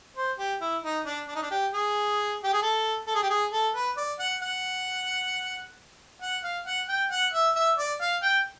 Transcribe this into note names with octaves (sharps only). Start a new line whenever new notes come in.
C5
G4
E4
D#4
D4
D4
D#4
D4
G4
G#4
G4
G#4
A4
A4
G#4
G4
G#4
A4
B4
D5
F#5
F#5
F#5
F5
F#5
G5
F#5
E5
E5
D5
F5
G5